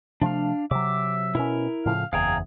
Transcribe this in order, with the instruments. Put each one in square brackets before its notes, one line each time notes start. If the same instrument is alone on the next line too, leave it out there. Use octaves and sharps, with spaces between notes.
[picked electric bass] C3 F3 A3 [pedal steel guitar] D4 F5
[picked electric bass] C3 F#3 [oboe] E5 [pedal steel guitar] D6
[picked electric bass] B2 C#4 [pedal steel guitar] E4 A#4
[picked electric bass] A2 C#3 F3 [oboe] F5
[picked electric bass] F#1 E2 [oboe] G#4 [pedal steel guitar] F5 G5 A#5